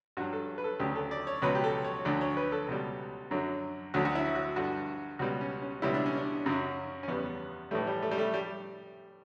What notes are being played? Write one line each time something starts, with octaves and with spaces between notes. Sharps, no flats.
G2 F#3 F#4
A4
B4
A4
D2 C#3 F#3 G4
A4
D5
C#5
C#2 B2 F#3 B4
G4
A4
C#5
D2 D3 F#3 D5
C#5
B4
A4
C#2 B2 G3
F#2 D3 F#3
D2 D3 F#3 F#4
F#4
E4
F#4
G2 D3 G3 F#4
C#2 B2 G3 F#4
C#4
C#4
C#2 B2 G3 E4
D4
C#4
D4
F#2 C#3 F#3
C#4
E2 C#3 G3 B3
A2 E3 G3 A3
G3
A3
G3
A3
G3